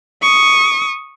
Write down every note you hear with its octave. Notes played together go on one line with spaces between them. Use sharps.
C#6 D#6